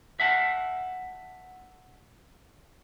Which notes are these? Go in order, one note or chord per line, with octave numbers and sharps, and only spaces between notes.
E5 F#5 A5